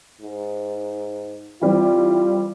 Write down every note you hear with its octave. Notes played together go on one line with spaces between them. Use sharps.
G#2
E3 G3 C4 F4